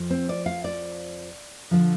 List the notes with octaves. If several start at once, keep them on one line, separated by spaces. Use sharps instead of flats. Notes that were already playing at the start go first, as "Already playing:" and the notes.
Already playing: F2 F3
C4
D5
F5
D5
D3 F3